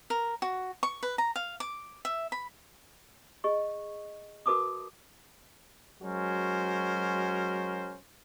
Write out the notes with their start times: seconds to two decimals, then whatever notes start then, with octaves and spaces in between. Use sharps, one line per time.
0.10 A#4
0.42 F#4
0.83 C#6
1.03 B4
1.18 A#5
1.36 F5
1.60 D6
2.05 E5
2.32 B5
3.44 G#4 D#5 C#6
4.46 F#4 A#4 B4 A5 D6 D#6
6.02 F#3 G#3 C#4 F#4 A#4 C5